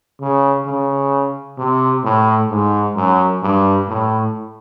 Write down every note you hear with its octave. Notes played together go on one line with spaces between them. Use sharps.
C#3
C#3
C3
A2
G#2
F#2
G2
A2